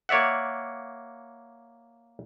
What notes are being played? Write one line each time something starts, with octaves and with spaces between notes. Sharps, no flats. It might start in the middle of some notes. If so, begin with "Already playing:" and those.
A#3 C#5 D5 E5 F#5